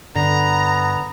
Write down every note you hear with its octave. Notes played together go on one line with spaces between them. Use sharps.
G2 D3 B3 A#5